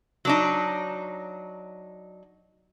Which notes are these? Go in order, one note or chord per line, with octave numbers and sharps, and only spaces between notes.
F#3 D4 D#4